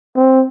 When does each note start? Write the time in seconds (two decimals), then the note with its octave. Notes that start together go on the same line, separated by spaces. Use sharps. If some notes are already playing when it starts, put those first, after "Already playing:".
0.16 C4